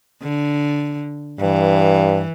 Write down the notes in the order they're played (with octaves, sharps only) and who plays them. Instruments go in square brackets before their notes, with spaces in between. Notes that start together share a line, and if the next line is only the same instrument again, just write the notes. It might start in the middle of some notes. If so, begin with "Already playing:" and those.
[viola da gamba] D3
[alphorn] G2 [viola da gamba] E3